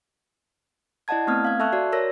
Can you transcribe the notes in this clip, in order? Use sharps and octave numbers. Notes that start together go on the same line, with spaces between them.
E4 D5 D#5 F#5 A5 G#6
A3 B3 C4 D#6 F6 G#6
F5 G#6
A4 E5 A5 C#6 E6 F#6
F#4 D5
A#4 C#5 E6 A#6